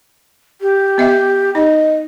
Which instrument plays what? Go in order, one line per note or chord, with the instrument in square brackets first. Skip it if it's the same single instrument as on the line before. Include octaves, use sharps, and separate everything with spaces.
[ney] G4
[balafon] B3 D#5 E5
[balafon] D#4 [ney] D#5